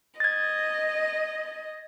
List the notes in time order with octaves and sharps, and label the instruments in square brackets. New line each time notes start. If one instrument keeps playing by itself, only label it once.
[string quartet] D#5 [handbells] G#6 A6